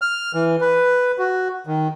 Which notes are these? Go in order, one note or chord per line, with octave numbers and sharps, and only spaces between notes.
F6
E3
B4
F#4
D#3